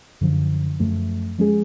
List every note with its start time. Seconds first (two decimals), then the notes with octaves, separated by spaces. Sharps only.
0.21 F#2 D3 F3
0.79 F#2 F3 A3
1.38 F3 G#3 C#4 G#4